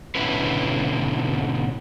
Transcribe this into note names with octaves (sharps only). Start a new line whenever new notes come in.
G#2 B2 D3 C#4 E4 B4